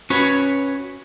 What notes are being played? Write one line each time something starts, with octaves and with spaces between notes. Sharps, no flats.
C#4 F#4 B4 C#5